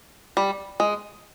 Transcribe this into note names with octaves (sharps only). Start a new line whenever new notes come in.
G3
G#3